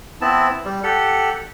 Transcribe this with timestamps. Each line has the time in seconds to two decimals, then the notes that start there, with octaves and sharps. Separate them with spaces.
0.21 B3 C4 E4 A5
0.65 G3
0.83 G4 A4 F#5